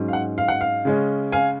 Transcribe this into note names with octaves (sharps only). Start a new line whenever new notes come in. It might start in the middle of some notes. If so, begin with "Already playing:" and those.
Already playing: G#2 F#3 C#4
F5
F#5
F5
F#5
F5
C#3 G#3 C#4
F5 G#5